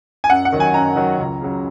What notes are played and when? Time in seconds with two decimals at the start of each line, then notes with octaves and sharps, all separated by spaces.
0.24 G#5
0.30 F#2 F#5
0.45 F#5
0.53 D#3 F#3
0.60 G#5
0.74 F#2 A#5
0.96 D#3 F#3
1.18 C#2
1.41 C#3 F#3